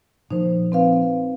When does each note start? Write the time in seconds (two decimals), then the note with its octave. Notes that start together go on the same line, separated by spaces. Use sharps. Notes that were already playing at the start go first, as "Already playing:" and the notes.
0.31 A#2 F3 D#4 C5
0.72 C4 B4 F5